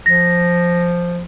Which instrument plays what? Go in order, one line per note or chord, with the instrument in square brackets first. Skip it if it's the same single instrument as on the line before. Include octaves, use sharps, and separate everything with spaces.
[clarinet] F3 [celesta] A#6